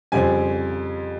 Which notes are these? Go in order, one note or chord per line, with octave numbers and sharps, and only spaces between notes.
F2 C#3 G3 C4 G#5